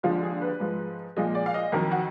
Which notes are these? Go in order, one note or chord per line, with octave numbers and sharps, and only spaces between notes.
D#2 D3 F3 G#3 F4
G#4
B4
G#2 F3 G#3
A#2 F3 G#3 D#5
D5
F5
D#5
F2 D#3 F#3 A#4
F#4